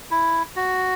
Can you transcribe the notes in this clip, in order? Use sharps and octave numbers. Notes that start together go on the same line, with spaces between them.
E4
F#4